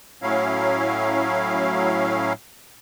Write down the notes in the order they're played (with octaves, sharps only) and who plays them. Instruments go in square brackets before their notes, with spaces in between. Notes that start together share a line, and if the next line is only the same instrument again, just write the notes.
[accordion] A2 F#3 C#4 E4 F5